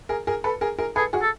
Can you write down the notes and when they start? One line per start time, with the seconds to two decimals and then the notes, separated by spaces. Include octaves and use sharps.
0.09 G#4 A#4
0.27 G#4 A#4
0.44 A4 B4
0.61 G#4 A#4
0.79 G#4 A#4
0.96 G#4 A4 B4
1.13 F#4 G#4
1.22 A4